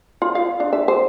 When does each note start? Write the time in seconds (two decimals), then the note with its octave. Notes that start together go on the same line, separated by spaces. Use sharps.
0.22 F4
0.35 F5
0.60 D4
0.73 E5
0.88 C5